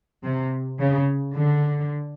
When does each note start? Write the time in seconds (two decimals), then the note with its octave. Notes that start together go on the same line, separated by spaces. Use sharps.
0.24 C3
0.80 C#3
1.35 D3